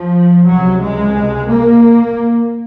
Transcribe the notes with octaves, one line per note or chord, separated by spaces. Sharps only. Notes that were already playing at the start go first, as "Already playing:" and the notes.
Already playing: F3
C#2 C3 F#3
G#3
A#3